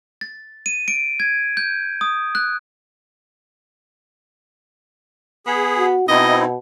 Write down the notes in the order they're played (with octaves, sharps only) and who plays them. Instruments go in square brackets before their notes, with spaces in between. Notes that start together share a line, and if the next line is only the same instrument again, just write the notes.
[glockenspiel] A6
D#7
D7
G#6
G6
D#6
F#6
[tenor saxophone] B3 [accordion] G#4
[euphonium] F#4
[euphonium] B2 [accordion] C4 D#4 E4 [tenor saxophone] D#5